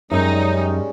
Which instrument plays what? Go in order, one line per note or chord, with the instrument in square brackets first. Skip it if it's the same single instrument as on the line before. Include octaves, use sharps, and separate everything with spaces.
[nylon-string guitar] F#2 [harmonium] G3 G#3 C#4 [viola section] D#4